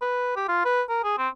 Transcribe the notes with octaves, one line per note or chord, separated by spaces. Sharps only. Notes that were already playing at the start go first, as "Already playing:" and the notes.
B4
G4
F4
B4
A#4
G#4
C4